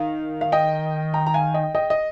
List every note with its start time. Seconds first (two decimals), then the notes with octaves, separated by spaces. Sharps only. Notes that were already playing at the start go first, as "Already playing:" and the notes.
Already playing: D#3 F5
0.41 F5
0.52 D#5 G5
1.14 G5 A#5
1.26 A#5
1.34 F5 G#5
1.54 D#5 G5
1.75 D#5 G5
1.90 D#5